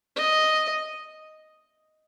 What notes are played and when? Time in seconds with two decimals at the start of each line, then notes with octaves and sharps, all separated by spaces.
0.16 D#5